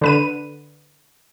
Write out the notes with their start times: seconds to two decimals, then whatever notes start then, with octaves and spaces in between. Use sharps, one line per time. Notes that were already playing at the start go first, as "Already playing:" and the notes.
0.01 D3 B4 D#7